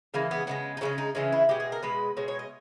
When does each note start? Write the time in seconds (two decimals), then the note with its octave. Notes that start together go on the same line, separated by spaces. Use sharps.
0.14 C#3 E3 G#3 A#3
0.31 B3
0.47 C#3 E3 G#3 B3
0.77 D#4
0.81 C#3 E3 G#3 C#4
0.98 D#4
1.15 C#3 E3 G#3 C#4
1.32 E4
1.49 B2 G#3 G4
1.60 G#4
1.72 A#4
1.83 B2 G#3 B4
2.17 B2 G#3 C#5
2.28 C#5
2.39 D#5